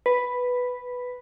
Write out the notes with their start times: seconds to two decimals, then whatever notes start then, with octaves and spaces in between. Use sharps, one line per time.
0.06 B4